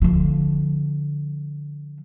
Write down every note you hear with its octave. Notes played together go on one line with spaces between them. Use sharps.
D3 F3